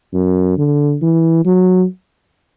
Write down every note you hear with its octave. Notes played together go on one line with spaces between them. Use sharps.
F#2
D3
E3
F#3